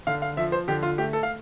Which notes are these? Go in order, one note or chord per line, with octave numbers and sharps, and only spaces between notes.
D3 F5
F5
F3 E5
C5
D3 G4
F4
A3 G4
A4
F5